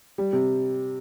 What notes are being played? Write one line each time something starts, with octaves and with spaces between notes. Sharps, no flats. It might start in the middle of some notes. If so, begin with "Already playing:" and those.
G3
C3